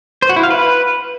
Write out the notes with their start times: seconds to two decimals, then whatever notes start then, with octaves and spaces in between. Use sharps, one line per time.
0.22 C5
0.29 F#4
0.36 E4
0.43 F5
0.50 B4